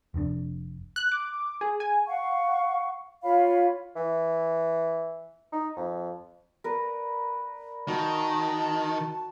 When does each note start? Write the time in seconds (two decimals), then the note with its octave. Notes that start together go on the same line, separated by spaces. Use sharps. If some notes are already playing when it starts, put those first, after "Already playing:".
0.14 F1 F2 C3 D4
0.96 F#6
1.12 D6
1.61 G#4
1.80 G#5
2.07 F5 F#5 C#6
3.23 F4 C#5 F5 B5
3.96 E3
5.52 D#4
5.76 F2
6.64 A#4 B4 D5
7.88 D#3 F#4 A5